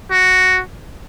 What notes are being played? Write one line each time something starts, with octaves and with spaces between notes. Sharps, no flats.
F#4